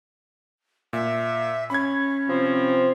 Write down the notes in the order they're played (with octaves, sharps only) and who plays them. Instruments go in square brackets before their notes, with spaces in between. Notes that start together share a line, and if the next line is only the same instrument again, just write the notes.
[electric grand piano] A#2 [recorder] E5
[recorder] C#4 [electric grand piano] B5 G#6
[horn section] C3 F3 C4